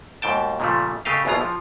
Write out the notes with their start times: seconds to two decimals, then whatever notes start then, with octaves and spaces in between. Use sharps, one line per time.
0.22 D#2 G#2 B2 G5 A5
0.60 A#2 C#3 F3 G3 A3
1.05 C#3 A3 G4 D#5 F5
1.25 G#1 E2 B2 F#3 F4 A#5
1.41 F3